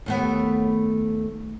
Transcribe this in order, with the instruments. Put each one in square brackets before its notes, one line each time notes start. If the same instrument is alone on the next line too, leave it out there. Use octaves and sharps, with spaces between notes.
[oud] D#2 A3 B3